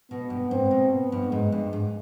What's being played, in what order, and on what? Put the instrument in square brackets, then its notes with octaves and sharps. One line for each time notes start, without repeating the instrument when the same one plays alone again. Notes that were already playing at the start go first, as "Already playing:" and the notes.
[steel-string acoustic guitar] B2 [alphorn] B3
[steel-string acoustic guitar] G2
[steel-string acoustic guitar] G#2 [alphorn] C4
[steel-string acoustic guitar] B2
[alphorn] B3
[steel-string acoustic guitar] G2
[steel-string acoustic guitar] G#2 [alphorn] G#3
[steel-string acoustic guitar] G2
G#2